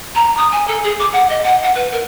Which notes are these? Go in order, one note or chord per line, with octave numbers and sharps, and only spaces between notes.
A#5
D#6
G#5
A4
G#4
D6
F#5
D#5
F#5
F#5
B4
A#4